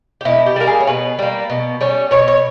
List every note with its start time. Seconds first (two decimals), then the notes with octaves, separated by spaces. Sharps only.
0.21 G4
0.25 B2 E4
0.46 G4
0.56 G3 A#3 A#4
0.67 G#4
0.80 C#5
0.87 B2 B4
1.19 G3 A#3
1.50 B2
1.81 G3 C#4
2.11 B2 C#5
2.28 C#5